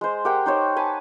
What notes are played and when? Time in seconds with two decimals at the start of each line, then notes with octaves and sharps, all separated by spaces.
0.01 G#3 C5
0.25 G4 A#4 F#5 G5
0.46 D#4 C5 C#5
0.76 G#5 A5 B5